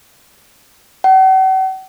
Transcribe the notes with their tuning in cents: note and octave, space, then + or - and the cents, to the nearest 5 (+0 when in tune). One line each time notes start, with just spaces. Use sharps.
F#5 +45